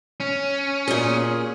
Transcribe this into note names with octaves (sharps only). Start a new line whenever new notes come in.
C#4
A#2 G#4